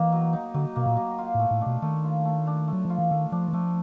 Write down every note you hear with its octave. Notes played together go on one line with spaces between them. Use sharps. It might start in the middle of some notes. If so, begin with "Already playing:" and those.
Already playing: E3 A#3 D#4
F#3
D#4
D3 F#3
B2 A#3
A#2
F#3
F4
A2 A3
A2
D4
B2
D#3 A3
F4
A3
D4
A3
F#3
F3 F4
E3
D#3 A3
F3 D4
E3
F3 A3